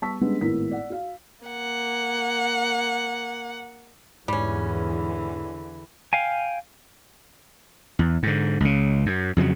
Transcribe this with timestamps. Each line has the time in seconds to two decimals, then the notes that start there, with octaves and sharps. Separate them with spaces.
0.02 G3 B3 A5 C#6 E6 B6
0.21 G3 G#3 B3 C#4 D4
0.41 G#1 A2 B3 E4 A#4 B6
0.71 D5 F#5
0.90 F#4 F5
1.46 A#3 F#5
4.28 E2 G#2 D3 E3 G3 C#4
6.13 F5 G5 G#5
7.99 E2
8.23 G#2 D3
8.60 C#2 C#3
9.06 F#2
9.37 F2 C#3 E3 F#3